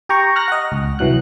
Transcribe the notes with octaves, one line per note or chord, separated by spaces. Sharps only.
G4 G5 A#5 C#6
F6 F#6 A#6
D#5 F#5
C#2
C2 E3 F#3 F#6